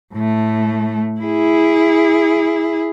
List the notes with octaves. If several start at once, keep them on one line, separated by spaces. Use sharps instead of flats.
A2 A3
E4 G#4